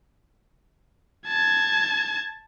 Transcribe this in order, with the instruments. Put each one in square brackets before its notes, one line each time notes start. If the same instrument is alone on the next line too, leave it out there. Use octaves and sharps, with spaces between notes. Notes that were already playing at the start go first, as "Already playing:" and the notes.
[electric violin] A5 G#6